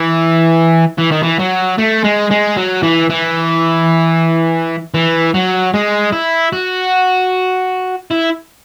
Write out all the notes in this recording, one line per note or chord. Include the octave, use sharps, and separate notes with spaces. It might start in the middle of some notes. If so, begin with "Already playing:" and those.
Already playing: E3
E3
D#3
E3
F#3
A3
G#3
G#3
F#3
E3
E3
E3
F#3
G#3
E4
F#4
E4